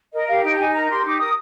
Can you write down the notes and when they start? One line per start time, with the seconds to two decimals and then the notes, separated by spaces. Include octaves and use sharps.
0.13 A#4 D#5
0.28 G4 F5
0.43 D#4 G5
0.54 A#5
0.59 D#4 G#5
0.73 A#4 A#5
0.89 G4 C6
1.04 D#4 D6
1.19 A#4 D#6